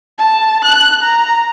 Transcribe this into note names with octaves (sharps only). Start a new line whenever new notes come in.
A5
F#6
A#5